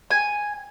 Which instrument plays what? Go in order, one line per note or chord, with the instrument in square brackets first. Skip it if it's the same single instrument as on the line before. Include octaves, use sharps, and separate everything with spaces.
[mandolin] G#5